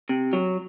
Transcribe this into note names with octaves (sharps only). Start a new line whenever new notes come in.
C3
F#3